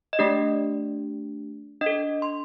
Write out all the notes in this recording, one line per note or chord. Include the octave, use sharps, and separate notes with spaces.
D#5
A3 D4 G4 D5
D4 D#5
A4
C6